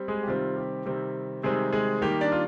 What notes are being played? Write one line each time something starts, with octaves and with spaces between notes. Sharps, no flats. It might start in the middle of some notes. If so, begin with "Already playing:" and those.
Already playing: G3 C4
G#3 G#4
G4
C3 D#3 G3 C4 F4
G4
C3 D#3 G3 C4
C3 D#3 G3 G#3 C4 G#4
G#3 G#4
D#3 G3 A#3 G4
D4 D5
F4